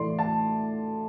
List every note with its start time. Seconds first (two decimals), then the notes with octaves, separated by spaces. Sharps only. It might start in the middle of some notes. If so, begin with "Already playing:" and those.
Already playing: A2 E3 A3 D5 C6
0.19 A5